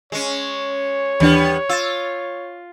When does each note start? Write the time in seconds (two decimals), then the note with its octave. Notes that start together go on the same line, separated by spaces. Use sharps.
0.12 G#3 C#4 C#5
1.20 D#2 E3 G3 B3 D4
1.69 F4 E6 A6